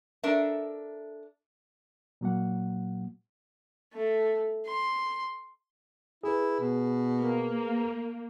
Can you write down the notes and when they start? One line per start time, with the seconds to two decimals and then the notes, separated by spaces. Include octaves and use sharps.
0.24 D4 A4 A#4 E5
2.21 A#2 F#3 A#3 F#5
3.93 A3
4.67 C6
6.24 E4 G#4 B4
6.60 B2
7.19 A#3